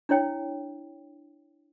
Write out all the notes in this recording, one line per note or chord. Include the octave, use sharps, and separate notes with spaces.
D4 E4 C#5 G5